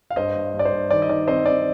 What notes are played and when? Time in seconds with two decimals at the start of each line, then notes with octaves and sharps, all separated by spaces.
0.10 F5
0.16 G2 C5 D#5
0.36 G2
0.54 G2
0.59 D5
0.65 C5
0.72 G2
0.91 D#3 D5
1.02 D#5
1.09 D#3 D5
1.28 C4 C5 D#5
1.46 C4 D5